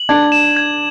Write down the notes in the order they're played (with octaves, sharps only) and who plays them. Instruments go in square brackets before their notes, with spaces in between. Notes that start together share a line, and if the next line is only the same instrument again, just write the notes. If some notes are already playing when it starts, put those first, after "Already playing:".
Already playing: [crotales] F#7
[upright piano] D4 [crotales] G#6
[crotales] E7
G#6